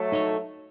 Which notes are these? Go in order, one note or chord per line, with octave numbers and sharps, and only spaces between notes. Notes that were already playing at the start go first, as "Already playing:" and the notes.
Already playing: F#3 A3
D#4 A4 C#5